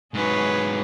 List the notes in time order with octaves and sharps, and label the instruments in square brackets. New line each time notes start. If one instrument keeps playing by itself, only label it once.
[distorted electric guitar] G#2 F#3 [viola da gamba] G#4 B4 C#5